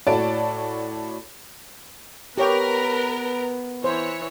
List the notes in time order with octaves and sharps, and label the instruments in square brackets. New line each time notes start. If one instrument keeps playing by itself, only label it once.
[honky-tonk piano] A2 F#4 C#5 D5 A5 D7
[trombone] B3 [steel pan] G4 C#5 G5 [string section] A#4 [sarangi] B4
[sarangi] E3 [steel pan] C5 [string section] C#5